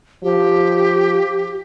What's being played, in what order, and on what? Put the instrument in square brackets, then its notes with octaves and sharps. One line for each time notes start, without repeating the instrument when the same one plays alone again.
[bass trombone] F3 [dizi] G4